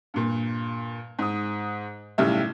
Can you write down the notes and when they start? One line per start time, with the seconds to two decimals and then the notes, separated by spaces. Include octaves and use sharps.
0.14 G2 A#2
1.19 G#2 D#6
2.18 B1 A2 C#3 G3 E5